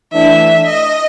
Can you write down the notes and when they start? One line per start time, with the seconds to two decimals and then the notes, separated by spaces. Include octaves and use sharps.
0.13 E3 A3 D4 E5
0.66 D#5